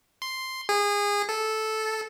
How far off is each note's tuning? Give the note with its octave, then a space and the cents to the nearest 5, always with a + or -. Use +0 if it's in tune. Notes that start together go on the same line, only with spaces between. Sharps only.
C6 +0
G#4 -25
A4 -10